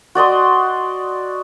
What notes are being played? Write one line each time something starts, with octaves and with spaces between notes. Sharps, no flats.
F#4 D5 D#5 C6